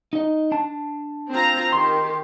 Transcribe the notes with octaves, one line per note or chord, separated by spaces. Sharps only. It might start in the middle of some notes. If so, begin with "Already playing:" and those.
D#4 D#5
D4 A5
C4 F4 A#5
D#3 G4 C6